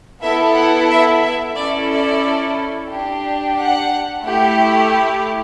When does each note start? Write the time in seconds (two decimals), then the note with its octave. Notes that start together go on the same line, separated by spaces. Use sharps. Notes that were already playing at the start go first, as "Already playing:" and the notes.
0.23 B3 E4 A4 E5
0.56 F#5
0.90 E5
1.23 E5
1.56 C#4 E4 A4 D5
1.90 D5
2.91 D4 G4
3.58 F#5
4.24 A3 E4 G4